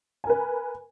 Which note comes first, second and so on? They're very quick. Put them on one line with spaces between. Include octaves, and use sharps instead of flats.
G#5 A#4 B4